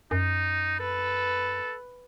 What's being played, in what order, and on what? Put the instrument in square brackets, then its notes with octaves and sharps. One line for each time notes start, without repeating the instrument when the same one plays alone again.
[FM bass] F#2 [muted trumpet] D#4
[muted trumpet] A4 [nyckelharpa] B4